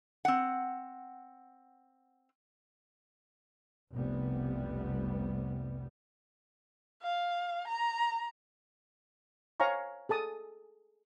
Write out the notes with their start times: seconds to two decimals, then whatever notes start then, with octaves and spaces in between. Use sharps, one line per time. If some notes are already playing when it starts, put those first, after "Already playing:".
0.25 C4 F#5
3.94 F1 C2 C3 G3 B3
7.02 F5
7.68 A#5
9.60 C5 C#5 F5 G#5 A#5 C#6
10.09 G#4 A4 A5 D#6